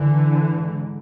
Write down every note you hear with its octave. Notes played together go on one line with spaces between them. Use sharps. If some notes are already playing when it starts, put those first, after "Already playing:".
Already playing: D3 E3
G#2